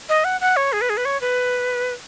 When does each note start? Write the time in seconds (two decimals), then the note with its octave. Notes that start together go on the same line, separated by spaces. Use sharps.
0.09 D#5
0.24 F#5
0.41 F#5
0.56 C#5
0.73 G#4
0.81 B4
0.90 G#4
0.97 B4
1.05 C#5
1.21 B4